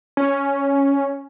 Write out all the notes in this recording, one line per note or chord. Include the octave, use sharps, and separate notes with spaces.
C#4